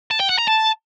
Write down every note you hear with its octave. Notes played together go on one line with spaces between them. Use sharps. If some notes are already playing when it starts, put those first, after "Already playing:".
A5
G5
F#5
A#5
A5